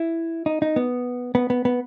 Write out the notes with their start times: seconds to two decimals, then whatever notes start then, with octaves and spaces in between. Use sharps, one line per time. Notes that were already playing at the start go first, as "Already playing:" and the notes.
Already playing: E4
0.46 D#4
0.62 D#4
0.76 B3
1.35 B3
1.50 B3
1.65 B3